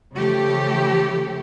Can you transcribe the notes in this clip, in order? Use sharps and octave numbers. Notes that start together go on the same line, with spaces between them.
C#3 E3 F3 A3 G4